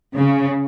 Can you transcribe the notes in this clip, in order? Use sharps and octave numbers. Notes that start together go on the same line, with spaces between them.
C#3